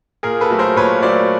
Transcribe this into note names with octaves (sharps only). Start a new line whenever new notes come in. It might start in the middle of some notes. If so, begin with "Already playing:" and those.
A#2 G#4 A#4
A4 B4
F#3 A3
A#4 C5
A#2 B4 C#5
F#3 A3 C5 D5